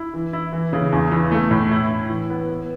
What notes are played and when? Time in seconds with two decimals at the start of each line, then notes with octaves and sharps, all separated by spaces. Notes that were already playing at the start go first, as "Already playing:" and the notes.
Already playing: E4
0.14 E3
0.33 E4
0.53 E3
0.73 C#3
0.92 E2
1.11 E3
1.32 A3
1.51 A2
1.71 E4
1.90 E4
2.10 E3
2.30 B3
2.50 B3